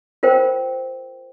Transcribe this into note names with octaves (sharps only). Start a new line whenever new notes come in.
F4 A#4 C5 G5